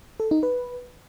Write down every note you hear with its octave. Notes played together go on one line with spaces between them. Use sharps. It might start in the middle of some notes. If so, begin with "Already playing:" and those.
A4
D#4
B4